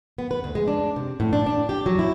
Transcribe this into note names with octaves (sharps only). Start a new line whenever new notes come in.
B3
B4
D2
G#3
D4
C3
A2
D4
D4
G4
F#3
E4